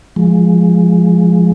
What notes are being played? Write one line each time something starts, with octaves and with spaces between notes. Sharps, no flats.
F3 G#3